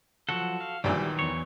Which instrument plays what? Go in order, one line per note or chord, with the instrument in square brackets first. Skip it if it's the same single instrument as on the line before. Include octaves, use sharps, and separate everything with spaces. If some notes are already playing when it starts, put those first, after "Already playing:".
[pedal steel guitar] F3 F#3 F#5 [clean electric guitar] F#4 A4
[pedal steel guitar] F5
[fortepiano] B1 A#2 E3 [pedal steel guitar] D#3 [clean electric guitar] G3
[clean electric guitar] E2 C#5